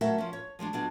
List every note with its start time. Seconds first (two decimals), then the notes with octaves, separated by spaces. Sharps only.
0.01 F#3 A3 C#4 F#4 A#4 E5
0.18 F3 C#4
0.33 C#5
0.59 F3 F#3 G#3 D4
0.73 B2 F#3 D4 F4 G#4